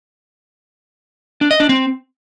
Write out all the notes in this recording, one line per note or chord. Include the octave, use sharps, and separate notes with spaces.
D4
D#5
D4
C4